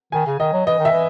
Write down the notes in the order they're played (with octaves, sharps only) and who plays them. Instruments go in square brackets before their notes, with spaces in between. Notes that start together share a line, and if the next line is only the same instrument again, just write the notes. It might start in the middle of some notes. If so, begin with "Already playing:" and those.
[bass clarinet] D#3 [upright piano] G#5
[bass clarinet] C#3
[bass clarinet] D#3 [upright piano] D#5
[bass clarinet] F#3
[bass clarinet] E3 [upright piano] D#5
[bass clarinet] D#3
[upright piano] E5
[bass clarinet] E3